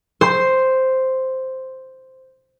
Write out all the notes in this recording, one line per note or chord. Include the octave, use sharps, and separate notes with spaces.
C5 C6